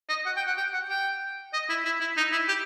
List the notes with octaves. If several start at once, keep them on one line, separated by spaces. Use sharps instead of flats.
D#5
F#5
G5
F#5
G5
F#5
G5
D#5
E4
E4
E4
D#4
E4
G4